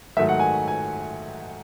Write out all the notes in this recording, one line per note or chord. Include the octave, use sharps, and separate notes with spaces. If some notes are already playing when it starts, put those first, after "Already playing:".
G#2 D#3 F#3 A3 E5
F#5
G#5
G#5